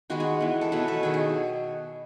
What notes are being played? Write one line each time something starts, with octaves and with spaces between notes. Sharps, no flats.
D#3 G#3 B3 F#4
G#4
E3 B3
A4
B2 F#3 A3 B4
A4
D#3 F#3 B3 G#4
G#4